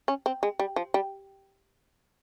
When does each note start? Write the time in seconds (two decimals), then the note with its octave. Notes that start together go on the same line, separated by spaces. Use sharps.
0.08 C#4
0.26 C4
0.43 G#3
0.59 G3
0.76 F3
0.94 G3